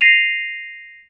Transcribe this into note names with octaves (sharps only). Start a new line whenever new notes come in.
A#6 C7 D#7 F7